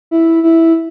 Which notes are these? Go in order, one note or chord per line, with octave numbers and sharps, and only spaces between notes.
E4
E4